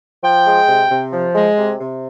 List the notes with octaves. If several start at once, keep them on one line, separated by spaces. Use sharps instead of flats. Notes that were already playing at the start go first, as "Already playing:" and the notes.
F3 G5
G#3
C3
C3
F3
G#3
C3
C3